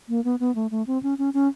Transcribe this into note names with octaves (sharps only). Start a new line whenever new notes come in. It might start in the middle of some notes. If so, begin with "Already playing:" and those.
A#3
B3
B3
A3
A3
C4
C#4
C#4
C#4